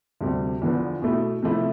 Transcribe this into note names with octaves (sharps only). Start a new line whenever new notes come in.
D2 C3 G3 C4
E2 D3 F3 B3 D4
B2 A3 E4
C3 F3 A3 E4